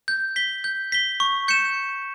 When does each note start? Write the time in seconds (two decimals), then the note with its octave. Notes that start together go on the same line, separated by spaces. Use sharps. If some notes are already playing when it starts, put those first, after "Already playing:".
0.08 G6
0.36 B6 G7
0.64 G6
0.92 B6 G7
1.20 C#6
1.48 G6 C#7 E7